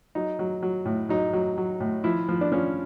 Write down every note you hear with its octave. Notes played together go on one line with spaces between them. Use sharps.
F#3 D#4
F#3
F#3
A2
F#3 D#4
F#3
F#3
A2
F3 E4
F3
D4
F3 C#4